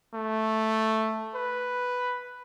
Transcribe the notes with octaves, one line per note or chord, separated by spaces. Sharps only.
A3
B4